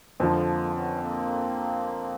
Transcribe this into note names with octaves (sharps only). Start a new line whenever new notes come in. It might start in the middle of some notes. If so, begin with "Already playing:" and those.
F2 D3 F3 G#3 A#3
G#3 A#3
B3 C#4
A#3 C4